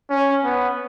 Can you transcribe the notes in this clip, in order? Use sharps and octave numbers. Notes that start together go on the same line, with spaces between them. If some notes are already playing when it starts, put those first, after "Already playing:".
C#4
B3